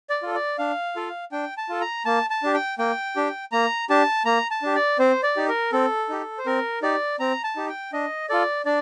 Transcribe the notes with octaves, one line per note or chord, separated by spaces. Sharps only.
D5
F4 A4
D5
D4 F5
F4 A4
D4 G5
A5
F4 A4
A#5
A#3 A5
A5
D4 G4
G5
A#3 G5
D4 G4
A#3 A#5
D4 G4 A5
A#3 A#5
A5
D4 G4
D5
C4 C5
D5
D#4 G4
A#4
C4 A4
D#4 G4
C5
C4 A#4
D#4 G4 D5
C4 A#5
A5
D#4 G4
G5
D4 D#5
F4 A4 D5
D4 D5